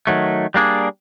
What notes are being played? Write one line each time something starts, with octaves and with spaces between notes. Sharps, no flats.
D#3 F#3 A3
G3 A#3 D4 G#4